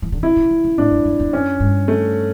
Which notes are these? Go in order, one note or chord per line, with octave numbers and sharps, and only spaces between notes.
E3
D3
C#3 E4
C#3
D3
C#3
A2 D4
F#2
F#2
E2
F#2 C#4
G2
A3